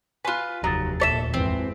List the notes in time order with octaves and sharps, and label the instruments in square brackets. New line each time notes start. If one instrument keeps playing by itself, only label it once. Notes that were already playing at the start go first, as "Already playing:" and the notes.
[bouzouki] F4 B4 [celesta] G#5 C6 F#6
[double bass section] F1 [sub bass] D#2 [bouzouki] F#3 [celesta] A#5 D#6 A6
[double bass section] D2 A#2 [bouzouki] A4 C#5 E5 [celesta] A6 B6 E7
[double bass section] G#1 F2 E3 [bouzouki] C4